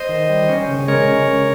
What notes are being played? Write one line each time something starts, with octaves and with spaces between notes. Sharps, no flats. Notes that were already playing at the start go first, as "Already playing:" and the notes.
Already playing: C5 D#5
D#3
G3
C#4
C#3
G#3 A#4 C#5
C#4
C#3